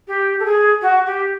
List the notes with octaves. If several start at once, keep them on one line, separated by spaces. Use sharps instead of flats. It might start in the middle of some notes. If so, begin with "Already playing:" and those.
G4
A4
G#4
F#4
G4